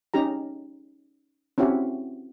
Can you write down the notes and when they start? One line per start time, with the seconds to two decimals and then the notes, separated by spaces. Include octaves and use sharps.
0.14 C#4 D#4 G4 A#5
1.58 C4 C#4 E4 F#4 G4